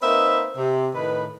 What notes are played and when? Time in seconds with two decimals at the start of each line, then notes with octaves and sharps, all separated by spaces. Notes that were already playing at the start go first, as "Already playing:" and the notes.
0.02 A#3 C4 D#4 B4 E5
0.57 C3
0.94 A2 D#3 B4